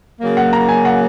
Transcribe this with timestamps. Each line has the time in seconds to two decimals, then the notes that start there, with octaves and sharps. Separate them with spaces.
0.21 C#3 F#3 A#3
0.37 F#5
0.53 A#5
0.69 G#5
0.85 F#5